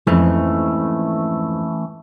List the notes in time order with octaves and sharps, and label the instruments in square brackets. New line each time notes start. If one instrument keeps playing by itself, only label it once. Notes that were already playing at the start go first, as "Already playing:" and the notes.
[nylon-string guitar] F2 G#2 [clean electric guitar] E3 A3 C#4